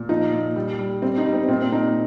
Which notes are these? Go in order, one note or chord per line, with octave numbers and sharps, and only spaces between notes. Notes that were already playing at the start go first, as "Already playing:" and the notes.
Already playing: A#2
F3 D#4
A#2
G3
G3
G3 C4
D#4
G3
C4
A#2 C4
C4
A#2 D#4